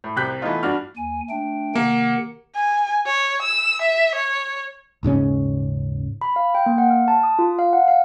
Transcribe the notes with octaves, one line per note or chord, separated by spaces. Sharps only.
A2
C2 C3 G4 F#6 G6 B6
E3 A3 B3 D#4 F4
G2 D4 F#4 F6
D#2 G#5
A3 D4 G5
C3 D#3 A#3 F#5
G#5
C#5
E6
E5
C#5
D#1 G#2 C#3 C#4
B5
F5
G5
A#3
F#5
F6
A5
D#6
F4
F5
F#5
F5